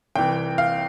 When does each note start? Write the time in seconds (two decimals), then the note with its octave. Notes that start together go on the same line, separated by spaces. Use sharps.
0.15 C2 C3 E3 G5
0.58 F5